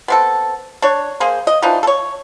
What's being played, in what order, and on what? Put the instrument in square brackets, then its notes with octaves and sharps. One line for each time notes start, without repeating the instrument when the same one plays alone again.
[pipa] B3 C4 A4
D4 C#5
A#3 G#4 C5
D#5
E3 F3 D4 D#4
A4 C#5